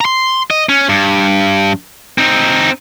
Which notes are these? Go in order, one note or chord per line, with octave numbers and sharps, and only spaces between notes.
A#5 C6
D#5
C#4
G2
C4 D#4